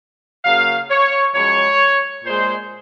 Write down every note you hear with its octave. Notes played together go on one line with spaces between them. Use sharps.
C#3 F#3 A#3 F5
C#5
F#2 F3 G#3 C#5
A#2 G#3 C5